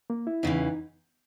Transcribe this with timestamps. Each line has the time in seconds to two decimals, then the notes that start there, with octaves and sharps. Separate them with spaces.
0.10 A#3
0.27 E4
0.43 E2 C#3 E3 D#4
0.60 D#4